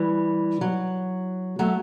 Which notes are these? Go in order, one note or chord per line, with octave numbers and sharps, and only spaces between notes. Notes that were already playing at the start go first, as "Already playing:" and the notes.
Already playing: E3 G3
F#3
F#3 A3